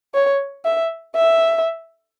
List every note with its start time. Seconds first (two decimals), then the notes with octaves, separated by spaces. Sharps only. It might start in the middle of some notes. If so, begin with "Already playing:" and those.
0.14 C#5
0.65 E5
1.16 E5